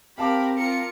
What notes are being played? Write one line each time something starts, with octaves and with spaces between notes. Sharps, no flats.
C4 G4 A#4 F5 A5 B5 D6
F4 A#4 C#7